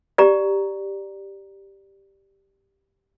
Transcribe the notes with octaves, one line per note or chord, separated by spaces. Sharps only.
G4 D5 A#5